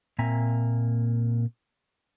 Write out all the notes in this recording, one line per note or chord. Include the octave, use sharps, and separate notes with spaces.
A#2 A#3 C4 E5 G#5 A#5